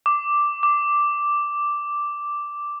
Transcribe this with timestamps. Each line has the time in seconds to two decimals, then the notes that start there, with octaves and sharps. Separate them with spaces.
0.06 D6
0.63 D6